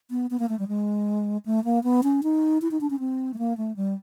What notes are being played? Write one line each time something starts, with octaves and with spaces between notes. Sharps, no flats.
B3
B3
A#3
A3
G3
G#3
A3
A#3
B3
C#4
D#4
E4
D#4
D4
C#4
C4
A3
A#3
A3
G3